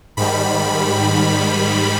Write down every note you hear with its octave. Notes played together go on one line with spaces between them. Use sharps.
G#2 D#3 G3 B5